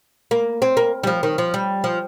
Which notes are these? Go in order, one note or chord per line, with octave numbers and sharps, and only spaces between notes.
A#3
C4
A#3
G3
F3
D#3
F3
G3
F3